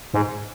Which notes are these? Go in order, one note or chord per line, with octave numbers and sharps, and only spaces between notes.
G#2